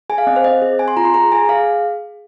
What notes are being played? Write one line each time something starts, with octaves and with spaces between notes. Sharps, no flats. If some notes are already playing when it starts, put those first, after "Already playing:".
G#4 G#5
F5
C4 D#5
C5
C4 D#5
G#4
C4 G#5
C6
F4 A#5
C6
G#4 A#5
G#4 G#5
G#4 F5